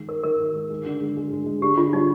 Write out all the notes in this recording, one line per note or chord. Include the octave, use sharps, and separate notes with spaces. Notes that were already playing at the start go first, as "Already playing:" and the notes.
Already playing: D#3 G#3
D#4 A#4
D#3 A#4
D#4
G#3
G#3
D3
G#3
G#3
G#3
G#3
D3 G4
D3 F4
G3 D#4